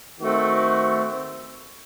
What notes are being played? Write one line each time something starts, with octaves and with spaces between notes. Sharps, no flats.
D#3 A3 C4 F#4